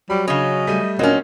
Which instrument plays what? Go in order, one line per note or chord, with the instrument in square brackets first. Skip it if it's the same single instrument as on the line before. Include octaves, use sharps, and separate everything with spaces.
[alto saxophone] F#3 [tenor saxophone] G3 [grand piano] B5
[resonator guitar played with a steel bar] C#3 C#4 [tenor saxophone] D#5
[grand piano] G3 A3 D#7
[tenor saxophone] A#2 [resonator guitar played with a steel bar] F#3 C#4 [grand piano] A#3 C4 [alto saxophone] D#5